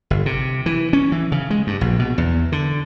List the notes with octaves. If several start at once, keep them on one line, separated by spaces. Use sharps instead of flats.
G1
C3
E3
C#4
E3
C#3
G#3
G2
A#1
B2
E2
D3